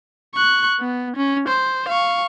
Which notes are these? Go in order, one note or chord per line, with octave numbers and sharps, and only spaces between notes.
C#6 F#6
B3
C#4
C5
F5 C#6